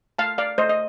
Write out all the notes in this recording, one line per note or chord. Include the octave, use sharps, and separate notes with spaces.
A3 F5 A5
D5 F5
A3 C5 D#5
D#5